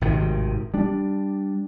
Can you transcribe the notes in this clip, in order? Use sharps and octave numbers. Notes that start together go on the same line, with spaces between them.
G#1 A2 C3 D#3
G3 D4